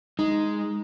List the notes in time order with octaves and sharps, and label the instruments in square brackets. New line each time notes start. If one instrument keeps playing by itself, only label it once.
[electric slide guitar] G#3 [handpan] D#4